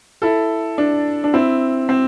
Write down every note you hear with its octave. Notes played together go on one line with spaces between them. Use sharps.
E4 A4
D4
D4
C4 E4
C4